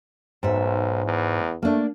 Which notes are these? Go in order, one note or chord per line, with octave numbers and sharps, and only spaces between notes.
B1 G#2 E5
E2
A3 A#3 D4